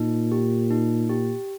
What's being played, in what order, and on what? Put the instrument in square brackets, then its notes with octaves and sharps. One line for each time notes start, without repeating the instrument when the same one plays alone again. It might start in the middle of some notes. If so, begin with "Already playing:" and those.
Already playing: [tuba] A#2 [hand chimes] D#4
[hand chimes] G4
D#4
G4